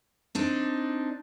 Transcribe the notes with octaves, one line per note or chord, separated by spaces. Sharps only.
C4 D4 D#4